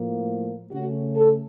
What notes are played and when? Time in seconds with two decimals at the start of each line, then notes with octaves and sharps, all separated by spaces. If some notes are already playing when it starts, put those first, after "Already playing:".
Already playing: A2 F3 A#3
0.71 C#3 A3 C#4 F#4
1.16 A4